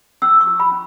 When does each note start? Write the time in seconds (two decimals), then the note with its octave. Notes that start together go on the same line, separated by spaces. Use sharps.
0.22 C#4 E6
0.41 C#6
0.47 E4
0.60 B5
0.71 C#4